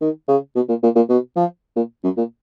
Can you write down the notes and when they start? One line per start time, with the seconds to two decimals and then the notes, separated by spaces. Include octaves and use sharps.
0.01 D#3
0.28 C#3
0.56 B2
0.69 A#2
0.83 A#2
0.96 A#2
1.09 B2
1.36 F3
1.76 A#2
2.04 F#2
2.17 A#2